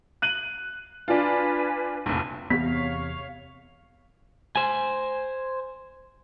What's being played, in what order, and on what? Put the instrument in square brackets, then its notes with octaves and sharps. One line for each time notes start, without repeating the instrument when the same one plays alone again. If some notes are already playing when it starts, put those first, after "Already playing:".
[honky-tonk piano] F#6 D#7 F#7
[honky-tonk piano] D4 F4 [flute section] B4 G#5
[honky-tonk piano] F1 A#1
[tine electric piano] E2 C3 [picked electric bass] B3 [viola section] C#5 F5 [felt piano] B6
[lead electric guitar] C5 G#5